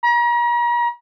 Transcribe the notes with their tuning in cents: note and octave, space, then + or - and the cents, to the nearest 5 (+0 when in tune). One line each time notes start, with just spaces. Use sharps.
A#5 +40